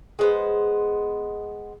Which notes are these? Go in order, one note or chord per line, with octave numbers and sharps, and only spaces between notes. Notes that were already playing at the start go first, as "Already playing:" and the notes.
G#3 B3 C5